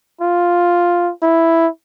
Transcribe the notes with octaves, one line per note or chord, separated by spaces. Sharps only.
F4
E4